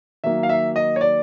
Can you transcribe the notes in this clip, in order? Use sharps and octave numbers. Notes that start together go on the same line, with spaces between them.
D#3 F#3 A#3 E5
F5
E5
D#5
C#5
D5